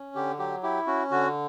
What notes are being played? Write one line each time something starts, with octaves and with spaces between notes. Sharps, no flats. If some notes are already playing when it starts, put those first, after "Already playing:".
Already playing: C#4
D3 G4
F#3 G4
E4 G4
C#4 F#4
D3 F#4